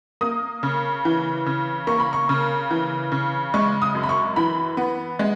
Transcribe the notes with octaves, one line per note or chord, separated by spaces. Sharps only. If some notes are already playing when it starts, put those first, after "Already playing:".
A#3 D#6
C#3
E3
C#3
A#3 C#6
B5
C#6
C#3
E3
C#3
G#3 C#6
D#6
F#2
B5
C#6
E3 B5
B3
G#3